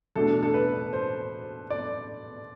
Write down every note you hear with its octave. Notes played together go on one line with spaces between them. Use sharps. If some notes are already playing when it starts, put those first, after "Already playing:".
E2 B2 A3 D4 A4
A4
B4
C5
D5